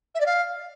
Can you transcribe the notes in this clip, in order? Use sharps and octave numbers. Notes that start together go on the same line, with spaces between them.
E5
D5
F5